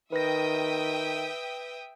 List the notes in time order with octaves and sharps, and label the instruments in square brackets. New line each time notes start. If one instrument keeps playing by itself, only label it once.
[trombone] D#3 [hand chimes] B4 A#6 [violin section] E5 G5 D#6